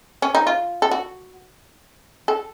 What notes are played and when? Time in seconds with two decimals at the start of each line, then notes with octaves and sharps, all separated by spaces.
0.22 C#4
0.35 D#4
0.47 F4
0.82 A4
0.91 F#4
2.28 A4